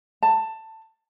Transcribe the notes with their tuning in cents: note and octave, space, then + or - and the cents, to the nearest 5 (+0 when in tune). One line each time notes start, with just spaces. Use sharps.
A5 +15